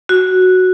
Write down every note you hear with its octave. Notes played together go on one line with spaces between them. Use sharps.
F#4